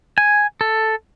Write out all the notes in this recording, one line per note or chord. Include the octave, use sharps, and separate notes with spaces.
G#5
A4